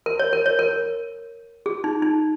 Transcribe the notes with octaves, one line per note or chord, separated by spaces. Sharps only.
A#4
C#5
A#4
C#5
A#4
G#4
D#4
D#4